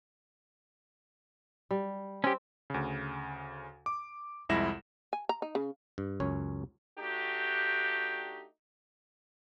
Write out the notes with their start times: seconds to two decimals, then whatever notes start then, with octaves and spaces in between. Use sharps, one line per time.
1.71 G3
2.24 C4 C#4 G4
2.70 D2 C#3
3.86 D6
4.49 C2 F2 G#3 E4 A#6 E7
5.13 G#5
5.29 A#5
5.42 D#4
5.55 C#3
5.98 G2
6.20 C#2 F#2 C#4 C#5
6.98 A3 D4 D#4 F#4 G4